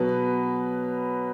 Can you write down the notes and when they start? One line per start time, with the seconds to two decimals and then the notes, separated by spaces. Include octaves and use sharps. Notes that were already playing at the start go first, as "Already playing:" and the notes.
Already playing: B2 F#3 B4